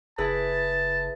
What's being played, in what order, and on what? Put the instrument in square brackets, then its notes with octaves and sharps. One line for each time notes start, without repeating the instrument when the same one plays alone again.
[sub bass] F#1 [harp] E4 G#4 B4 [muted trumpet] A5